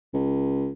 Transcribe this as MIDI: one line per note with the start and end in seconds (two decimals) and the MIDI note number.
0.13 0.70 37